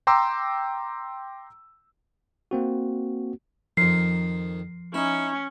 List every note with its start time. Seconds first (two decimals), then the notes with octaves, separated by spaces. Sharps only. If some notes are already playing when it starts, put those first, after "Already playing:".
0.07 G5 A#5 C6 D6 E6
2.51 A#3 C4 F#4
3.77 F2 D#3 F3 C7
4.94 C#4 D#4 E4